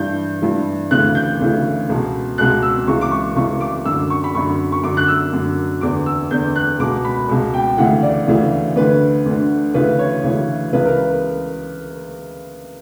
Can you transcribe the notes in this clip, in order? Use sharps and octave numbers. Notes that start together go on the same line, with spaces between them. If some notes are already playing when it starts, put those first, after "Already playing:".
Already playing: G2 E3 G6
G2 E3
D2 C#3 E3 F#6
G6
D2 C#3 E3
C#2 B2
C#2 B2 F#6
E6
C#2 C#3 E3 C#6
D6
C#6
C#2 C#3 E3 C#6
D6
F#2 D3 E6
C#6
B5
F#2 D3 C#6
C#6
F#2 D3 D6
F#6
E6
F#2 D3
E2 D3 D6
E6
E2 D3 G6
F#6
C#2 B2 D6
B5
C#2 B2
G5
D2 C#3 E3 F#5
D5
D2 C#3 E3
D2 D3 B4
D2 D3
D2 C#3 E3 B4
C#5
D2 C#3 E3
C#2 C#3 E3 B4
A#4
B4